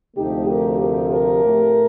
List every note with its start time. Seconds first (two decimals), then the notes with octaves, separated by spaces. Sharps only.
0.16 D2 C3 F3 A3 D#4 G4
0.48 G4 A#4
0.79 G4 A#4
1.11 G4 A#4
1.43 A2 A3